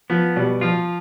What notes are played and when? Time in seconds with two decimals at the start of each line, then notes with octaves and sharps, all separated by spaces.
0.10 F3 B3
0.36 B2 G3
0.61 F3 F4